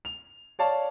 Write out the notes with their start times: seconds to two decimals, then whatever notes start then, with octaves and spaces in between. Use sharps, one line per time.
0.05 F7
0.59 C#5 D5 F5 A5